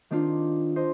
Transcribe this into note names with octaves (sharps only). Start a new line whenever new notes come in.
D#3 C4 D4 F4
D4 C5 D#5